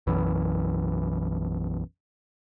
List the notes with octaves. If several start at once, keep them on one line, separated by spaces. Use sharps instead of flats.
B1 F#2 E3